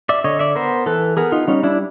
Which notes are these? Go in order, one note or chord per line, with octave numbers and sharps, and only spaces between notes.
D5 E5
D3 C#5 D#5
D5 E5
B3 A#4 C5
E3 A4 B4
B3 G#4 A#4
D#4 F4
G3 C#4 D#4
D4 E4